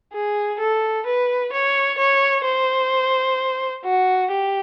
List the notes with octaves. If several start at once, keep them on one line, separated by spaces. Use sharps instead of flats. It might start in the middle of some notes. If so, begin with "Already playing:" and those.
G#4
A4
B4
C#5
C#5
C5
F#4
G4